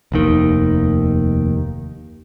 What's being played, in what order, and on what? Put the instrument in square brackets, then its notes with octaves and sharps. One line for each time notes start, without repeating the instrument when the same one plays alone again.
[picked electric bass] F1 D#2 D#3